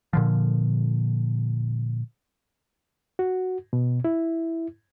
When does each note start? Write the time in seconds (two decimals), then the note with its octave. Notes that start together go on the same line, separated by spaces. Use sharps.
0.13 A#2 D3 F3
3.19 F#4
3.73 B2
4.04 E4